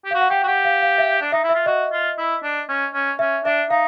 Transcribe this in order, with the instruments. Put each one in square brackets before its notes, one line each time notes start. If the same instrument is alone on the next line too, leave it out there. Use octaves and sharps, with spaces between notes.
[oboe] G4
[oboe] F#4 [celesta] F5
[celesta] F#5
[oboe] G4 [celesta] G5
[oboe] F#4
[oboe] G4 [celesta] F#5
[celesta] F5
F5
E5
[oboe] D4
[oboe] D#4 [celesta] E5
[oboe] E4
[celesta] E5
[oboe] F4
[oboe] F#4 [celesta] D#5
[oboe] F4
E4
D4
C#4
C#4
[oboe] C#4 [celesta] E5
[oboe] D4 [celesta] E5
[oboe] D#4 [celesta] F5